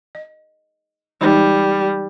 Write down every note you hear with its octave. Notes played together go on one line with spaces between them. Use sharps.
D#5
E3 G3 G#3 D#4